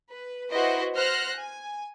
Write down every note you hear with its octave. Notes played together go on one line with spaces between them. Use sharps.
B4
E4 F#4 B4 C5 D#5
C5 F#5 F6 F#6 A#6
G#5